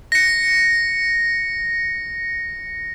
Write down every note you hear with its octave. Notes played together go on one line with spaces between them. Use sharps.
A#6 C#7